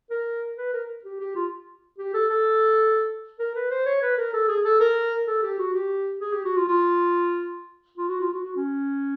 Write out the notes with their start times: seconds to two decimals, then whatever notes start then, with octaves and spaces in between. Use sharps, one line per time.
0.10 A#4
0.57 B4
0.73 A#4
1.05 G4
1.20 G4
1.35 F4
1.98 G4
2.14 A4
2.30 A4
3.39 A#4
3.55 B4
3.71 C5
3.86 C#5
4.02 B4
4.18 A#4
4.33 A4
4.48 G#4
4.65 A4
4.80 A#4
5.27 A4
5.43 G4
5.58 F#4
5.74 G4
6.21 G#4
6.33 G4
6.45 F#4
6.57 F4
6.68 F4
7.98 F4
8.09 F#4
8.21 F4
8.33 F#4
8.44 F#4
8.56 C#4